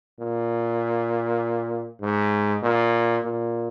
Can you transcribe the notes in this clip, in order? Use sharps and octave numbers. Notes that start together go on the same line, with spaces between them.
A#2
G#2
A#2
A#2